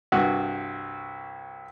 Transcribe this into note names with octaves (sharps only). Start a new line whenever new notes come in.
C2 G2 F#4